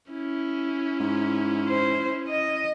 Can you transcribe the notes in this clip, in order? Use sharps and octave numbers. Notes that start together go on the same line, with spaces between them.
C#4 E4
G#2
C5
D#5